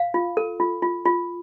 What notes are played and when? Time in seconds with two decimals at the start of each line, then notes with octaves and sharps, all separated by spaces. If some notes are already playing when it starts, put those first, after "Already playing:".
Already playing: F5
0.14 F4
0.37 A4
0.60 F4
0.82 F4
1.05 F4